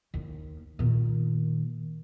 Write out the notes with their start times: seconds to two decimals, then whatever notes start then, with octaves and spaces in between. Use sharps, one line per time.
0.14 D#2
0.79 A#2 D#3